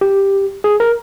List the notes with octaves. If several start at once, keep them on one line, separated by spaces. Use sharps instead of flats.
G4
G#4
A#4